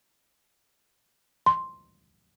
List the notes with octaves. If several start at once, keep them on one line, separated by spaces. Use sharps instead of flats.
C6